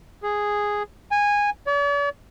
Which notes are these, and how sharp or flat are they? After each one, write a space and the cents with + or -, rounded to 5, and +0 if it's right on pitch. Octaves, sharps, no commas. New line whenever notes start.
G#4 -5
G#5 -15
D5 -45